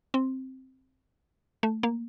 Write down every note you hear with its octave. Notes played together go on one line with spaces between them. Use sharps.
C4
A3
A#3